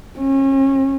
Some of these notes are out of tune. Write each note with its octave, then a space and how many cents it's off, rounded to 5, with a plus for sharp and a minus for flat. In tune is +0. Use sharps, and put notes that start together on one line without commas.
C#4 -35